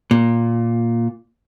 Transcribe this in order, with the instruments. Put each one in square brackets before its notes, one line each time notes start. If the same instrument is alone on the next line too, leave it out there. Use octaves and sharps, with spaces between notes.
[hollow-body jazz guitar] A#2